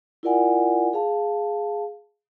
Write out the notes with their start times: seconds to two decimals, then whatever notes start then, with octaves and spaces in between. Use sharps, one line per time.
0.23 E4 F4 A#4 D5 F#5 G#5
0.93 G#4 F5 A5